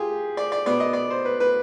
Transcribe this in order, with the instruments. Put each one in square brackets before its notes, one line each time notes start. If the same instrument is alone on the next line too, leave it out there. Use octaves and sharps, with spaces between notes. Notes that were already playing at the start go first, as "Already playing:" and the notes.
Already playing: [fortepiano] F4 G4 G#4
D5
D5
B2 B3 D5
D#5
D5
C5
B4
B4